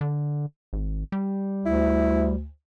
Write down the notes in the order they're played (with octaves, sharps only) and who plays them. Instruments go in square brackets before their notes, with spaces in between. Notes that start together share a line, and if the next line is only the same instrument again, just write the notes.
[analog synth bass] D3
G#1
G3
[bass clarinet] D2 [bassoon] E4